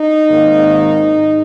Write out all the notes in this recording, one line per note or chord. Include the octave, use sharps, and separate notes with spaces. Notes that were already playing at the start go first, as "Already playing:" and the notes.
Already playing: D#4
G#1 G#2 D#3 A#3
G#2